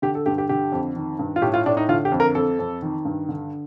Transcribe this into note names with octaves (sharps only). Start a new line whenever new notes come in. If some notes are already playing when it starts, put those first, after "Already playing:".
D3 G4
A4
G2 G4
G4
D3 G4
F2
D#3
G2
F4
A2 G4
F4
A2 D4
D#4
D3 F4
G4
F2
A#4
F2 A4
F2
D#3
G2
D3